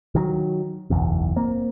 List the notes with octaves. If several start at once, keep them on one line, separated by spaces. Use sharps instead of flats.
D#3 E3 F#3
F#1 B1 E2
A#3 C4